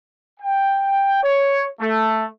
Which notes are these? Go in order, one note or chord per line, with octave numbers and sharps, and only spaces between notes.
G5
C#5
A3